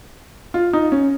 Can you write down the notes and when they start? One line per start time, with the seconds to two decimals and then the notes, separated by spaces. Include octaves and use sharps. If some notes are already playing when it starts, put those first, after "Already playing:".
0.54 F4
0.73 D#4
0.92 C#4